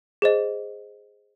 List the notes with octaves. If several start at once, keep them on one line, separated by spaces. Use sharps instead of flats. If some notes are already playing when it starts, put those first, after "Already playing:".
G#4 C5 D#5